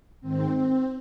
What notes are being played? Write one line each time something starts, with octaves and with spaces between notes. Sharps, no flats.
G#2 D#3 C4
C4